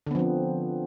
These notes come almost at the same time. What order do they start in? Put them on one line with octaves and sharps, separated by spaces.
D3 B3 F3 C4